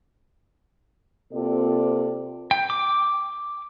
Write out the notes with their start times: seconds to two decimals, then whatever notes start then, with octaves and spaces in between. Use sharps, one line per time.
1.32 C3 A#3 C4 F4 A4 D5
2.51 G5
2.70 D6